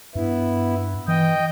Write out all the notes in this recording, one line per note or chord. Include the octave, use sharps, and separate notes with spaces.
G2 B3 E4
E3 D#5 G5